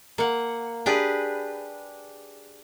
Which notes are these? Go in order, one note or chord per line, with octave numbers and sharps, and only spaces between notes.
A#3 F#5
D4 G4 G#4 B4